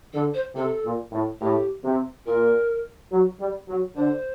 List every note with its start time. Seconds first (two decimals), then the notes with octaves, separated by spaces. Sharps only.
0.13 D3 A4
0.34 C5
0.55 C3 A4
0.84 A#2
1.12 A2
1.41 A2 G4
1.83 C3
2.26 A#2 A#4
3.11 F#3
3.39 G3
3.68 F#3
3.96 D3 C5